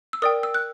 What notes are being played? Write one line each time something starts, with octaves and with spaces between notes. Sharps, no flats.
E6
A#4 D5 G5 D#6
E6
F#6